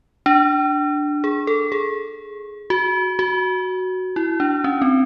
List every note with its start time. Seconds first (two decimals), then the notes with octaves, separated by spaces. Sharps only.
0.26 D4
1.24 G#4
1.47 A4
1.72 G#4
2.70 F#4
3.19 F#4
4.16 E4
4.40 D4
4.64 C#4
4.82 C4